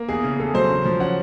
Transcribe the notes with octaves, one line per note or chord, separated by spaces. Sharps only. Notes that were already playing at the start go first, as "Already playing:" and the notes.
Already playing: A#3
E2 G#4
C#3
E2 A4
F#3 C5
C#3
F3
C#4 F#5